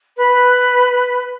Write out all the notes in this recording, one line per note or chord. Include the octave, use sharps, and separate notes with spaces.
B4